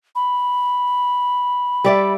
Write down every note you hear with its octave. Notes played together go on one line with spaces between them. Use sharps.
B5
G3 D5 E5